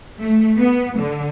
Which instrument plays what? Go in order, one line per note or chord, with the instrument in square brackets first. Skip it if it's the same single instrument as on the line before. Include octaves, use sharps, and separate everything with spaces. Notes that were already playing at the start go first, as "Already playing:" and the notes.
[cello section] A3
B3
D3